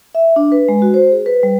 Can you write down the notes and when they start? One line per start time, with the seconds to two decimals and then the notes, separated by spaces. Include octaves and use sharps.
0.15 E5
0.36 D4
0.52 B4
0.68 G#3
0.82 F#4
0.94 C5
1.11 G#4
1.26 B4
1.43 G3